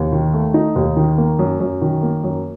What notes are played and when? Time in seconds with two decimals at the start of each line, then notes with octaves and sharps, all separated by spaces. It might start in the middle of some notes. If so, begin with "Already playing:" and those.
Already playing: D#2
0.12 D#3
0.34 A3
0.54 D#4
0.76 D#2
0.96 D#3
1.18 A#3
1.39 F#2
1.60 F#2
1.81 D#3
2.03 A#3
2.24 F#2